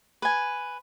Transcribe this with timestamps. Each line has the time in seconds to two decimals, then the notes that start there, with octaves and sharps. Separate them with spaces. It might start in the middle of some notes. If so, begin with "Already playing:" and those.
0.22 B4 G#5